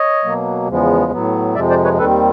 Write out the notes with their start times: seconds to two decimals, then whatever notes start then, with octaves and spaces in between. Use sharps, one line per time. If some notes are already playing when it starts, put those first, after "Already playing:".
Already playing: C#5 D#5
0.25 B2 F#3 A#3
0.68 E2 C#3 F3 G#3 B3
1.12 A2 F#3 B3
1.55 F2 C3 F3 G#3 D5 E5
1.70 C5 D5
1.84 B4 C#5
1.99 D#2 D#3 G3 C4 A4 B4